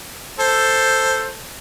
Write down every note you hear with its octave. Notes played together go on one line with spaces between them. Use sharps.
A4 C5